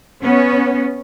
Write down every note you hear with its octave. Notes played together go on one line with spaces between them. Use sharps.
B3 C#4